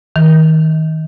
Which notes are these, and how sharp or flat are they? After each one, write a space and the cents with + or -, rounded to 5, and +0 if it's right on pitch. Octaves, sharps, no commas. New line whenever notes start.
D#3 +25